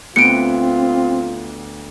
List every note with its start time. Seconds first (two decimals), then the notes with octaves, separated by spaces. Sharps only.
0.16 D2 B3 C4 F4 G5 C#7 D7